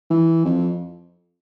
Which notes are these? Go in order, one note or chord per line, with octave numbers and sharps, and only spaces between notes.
E3
F2